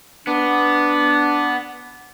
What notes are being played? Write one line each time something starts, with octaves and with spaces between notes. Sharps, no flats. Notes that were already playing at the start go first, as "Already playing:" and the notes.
B3 D4